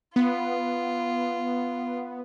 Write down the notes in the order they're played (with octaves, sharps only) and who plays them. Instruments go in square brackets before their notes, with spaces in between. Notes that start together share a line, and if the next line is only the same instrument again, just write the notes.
[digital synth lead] B3 [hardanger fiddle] F4